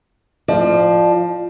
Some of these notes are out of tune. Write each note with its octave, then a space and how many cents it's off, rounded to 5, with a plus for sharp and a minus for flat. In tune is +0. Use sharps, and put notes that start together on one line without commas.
F3 +0 D5 +35